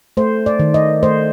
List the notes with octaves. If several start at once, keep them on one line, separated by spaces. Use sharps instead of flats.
A3 C5
D5
D#3
D#5
A3 C5